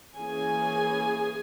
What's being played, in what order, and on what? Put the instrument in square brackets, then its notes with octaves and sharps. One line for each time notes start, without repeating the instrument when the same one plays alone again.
[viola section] E3 A#3 C#4 G#4 G#5